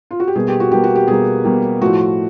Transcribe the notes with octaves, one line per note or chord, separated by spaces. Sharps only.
F4
F#4
G4
B2 G3 A#3 G#4
G4
F#4
B2 G3 A#3 G4
F#4
G4
B2 G3 A#3 G#4
B2 G3 A#3
A2 F3 A3 F#4